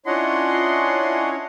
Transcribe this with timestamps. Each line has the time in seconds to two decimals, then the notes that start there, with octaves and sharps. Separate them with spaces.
0.06 C#4 D4 E4 F4 C#5 D#5 F#5 C6